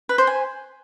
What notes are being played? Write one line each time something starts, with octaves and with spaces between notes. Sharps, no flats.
B4
C5
G#5